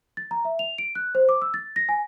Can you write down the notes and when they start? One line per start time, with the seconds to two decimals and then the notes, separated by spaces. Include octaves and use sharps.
0.17 A6
0.31 A#5
0.45 E5
0.59 F7
0.78 D7
0.95 F#6
1.15 C5
1.29 D6
1.42 E6
1.54 A6
1.76 A#6
1.89 G#5